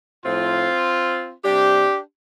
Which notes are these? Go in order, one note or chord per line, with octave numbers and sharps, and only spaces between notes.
A2 F3 C4 F4
C3 G3 D4 G4